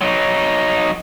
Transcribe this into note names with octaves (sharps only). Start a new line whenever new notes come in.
F#3 D#4